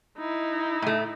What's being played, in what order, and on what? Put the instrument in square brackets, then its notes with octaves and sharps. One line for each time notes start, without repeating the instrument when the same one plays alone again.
[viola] D#4 E4
[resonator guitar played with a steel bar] A2 A3